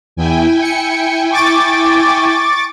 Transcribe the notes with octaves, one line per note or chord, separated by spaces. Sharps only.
E2 E4 G5 G#5
C#7
C#6 D6 A6